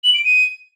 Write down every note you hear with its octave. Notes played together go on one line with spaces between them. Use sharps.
F#7
D7
D#7